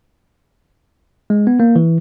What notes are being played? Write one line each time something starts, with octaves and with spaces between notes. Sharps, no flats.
G#3
B3
A#3
E3